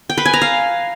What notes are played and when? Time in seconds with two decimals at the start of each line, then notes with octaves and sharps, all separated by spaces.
0.10 G5
0.18 B4
0.26 G#5
0.34 A#5
0.42 F5